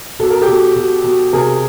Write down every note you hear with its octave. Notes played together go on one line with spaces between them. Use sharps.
B2 A4
A#4
G4 A4
B2
B2
B2
C3 G#4 A#4